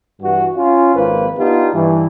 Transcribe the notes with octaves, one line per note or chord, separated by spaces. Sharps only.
G2 E3 F#4
C#4 F4
G#1 F2 A#3 B4 C5
B3 D4 D#4 F4 G4
G2 E3